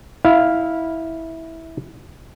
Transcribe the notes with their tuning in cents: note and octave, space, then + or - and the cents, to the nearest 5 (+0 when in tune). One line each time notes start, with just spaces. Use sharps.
E4 -15 F5 +0